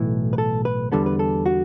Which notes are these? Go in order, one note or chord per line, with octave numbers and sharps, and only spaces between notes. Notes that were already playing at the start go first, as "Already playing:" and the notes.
Already playing: B1 A2 E3
B4
A4
B4
E2 D3 G3 B3 A4
B4
A4
F#4